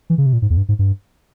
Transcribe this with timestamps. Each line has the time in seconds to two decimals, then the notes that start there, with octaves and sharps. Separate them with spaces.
0.10 E3
0.18 C#3
0.26 C3
0.33 A#2
0.42 G#2
0.50 E2
0.57 G2
0.69 G#2
0.79 G2